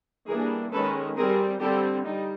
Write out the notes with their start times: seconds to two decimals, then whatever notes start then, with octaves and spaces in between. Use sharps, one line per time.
0.28 E3 G3 A#3 D4 G#4 A#4
0.72 D#3 G#3 C#4 A4 B4
1.17 G3 C4 G#4 A#4
1.61 D3 G3 C4 G4 A4
2.06 G3 D#4